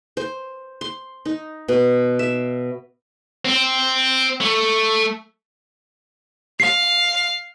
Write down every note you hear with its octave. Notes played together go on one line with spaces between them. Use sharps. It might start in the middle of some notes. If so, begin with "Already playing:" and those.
C5
C6
D#4
B2
E5
C4
A3
F5 C7